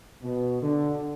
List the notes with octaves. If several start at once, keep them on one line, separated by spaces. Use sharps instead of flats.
B2
D3